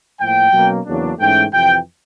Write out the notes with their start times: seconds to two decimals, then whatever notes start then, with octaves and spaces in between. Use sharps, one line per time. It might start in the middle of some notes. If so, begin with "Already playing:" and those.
0.20 A2 F3 A#3 G5
0.52 B2 F#3 A#3 C#4
0.86 E2 C#3 F#3 A#3 D4
1.18 G#2 E3 A3 C#4 G5
1.52 F2 C3 E3 G5